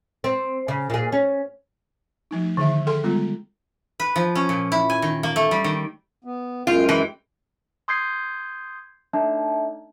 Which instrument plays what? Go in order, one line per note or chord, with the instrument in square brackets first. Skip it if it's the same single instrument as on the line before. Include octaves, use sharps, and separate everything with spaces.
[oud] C4
C#3
A#2 G#4
C#4
[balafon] F3 A3 D#4
D3 D#3 G#4 E5
G#4 A4 G5 C6
G3 G#3 B3 F4
[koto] B4
F3
C#4
A#2
E4
G#5
D#3
A#3
A3
G3
D#3
[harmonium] B3
[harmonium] F#2 G#3 G5 [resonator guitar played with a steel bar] F4
[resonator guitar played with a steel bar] E3
[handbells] C6 D#6 G6 G#6 C7
A3 D4 D#4